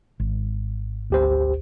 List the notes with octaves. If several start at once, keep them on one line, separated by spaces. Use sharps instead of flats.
G#1
D2 G4 C5